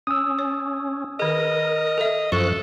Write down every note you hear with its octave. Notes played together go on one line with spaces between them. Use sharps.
C#4 D#6 E6
C#5
D#3 G#4 A#4 D#5
A4 E5
F#2 F3 A4 C#6 F#6